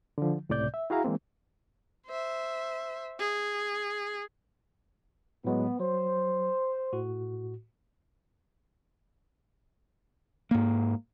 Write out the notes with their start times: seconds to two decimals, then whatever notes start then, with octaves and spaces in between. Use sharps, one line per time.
0.18 D3 F3
0.49 C#2 A2 C3 D5 G6
0.74 E5
0.90 E4 F#4 G#4 F5 A#5
1.04 E3 G#3 A#3 C4
2.07 C5 E5
3.20 G#4
5.44 A2 F#3 G#3 B3
5.80 F#3 C5
6.92 A2 F#4
10.51 G#2 A#3